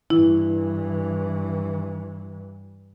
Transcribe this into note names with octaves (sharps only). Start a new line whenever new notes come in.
G2 E3 E4